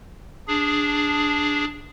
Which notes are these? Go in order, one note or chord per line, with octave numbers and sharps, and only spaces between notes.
D4 G#4